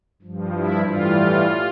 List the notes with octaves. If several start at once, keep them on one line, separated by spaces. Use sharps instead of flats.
G2 F3
E4
A2 E3 G3 F4